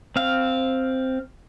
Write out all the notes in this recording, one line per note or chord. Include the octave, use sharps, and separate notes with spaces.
C4 F5